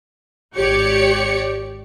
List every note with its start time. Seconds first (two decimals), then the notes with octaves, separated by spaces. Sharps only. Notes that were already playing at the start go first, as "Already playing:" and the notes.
0.54 G#1 G4 C#5 D5 C#7